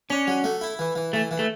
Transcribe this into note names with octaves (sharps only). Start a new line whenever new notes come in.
C#4 D4
F#3
A3
E4
E3
E3
E3 A3
E3
A3